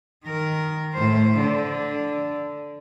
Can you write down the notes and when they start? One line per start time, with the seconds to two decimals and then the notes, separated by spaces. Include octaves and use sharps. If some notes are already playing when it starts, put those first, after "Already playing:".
0.24 D#3 A#4
0.94 A2 C5
1.40 D3